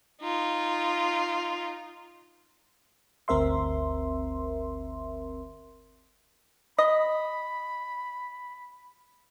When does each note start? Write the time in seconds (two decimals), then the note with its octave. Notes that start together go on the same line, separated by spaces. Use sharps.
0.21 D#4 F4
3.28 G1 D2 C4 A#4 E5 C6
6.79 D#5 B5